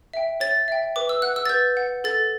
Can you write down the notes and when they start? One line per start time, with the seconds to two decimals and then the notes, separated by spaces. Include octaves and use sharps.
0.13 E5 G5
0.40 C#5 A6
0.68 E5 G5
0.96 B4 D6
1.09 E6
1.22 F#5 F#6
1.36 E6
1.45 A6
1.49 B4 G6
1.77 F#5
2.04 A4 A6